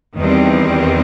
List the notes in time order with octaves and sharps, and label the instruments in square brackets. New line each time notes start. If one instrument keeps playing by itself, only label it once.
[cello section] E2 D#3 G3 C4